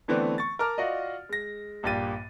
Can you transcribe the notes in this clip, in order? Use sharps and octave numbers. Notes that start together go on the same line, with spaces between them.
D3 E3 A3 B3 C4 D4
C#6 A6
A#4 A5 A#5 D6 F6
F4 F#4 D5 D#5
G#3 A#6
A#1 G2 A#3 G4 A6 D#7